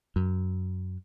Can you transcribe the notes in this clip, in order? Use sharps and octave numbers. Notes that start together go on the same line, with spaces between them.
F#2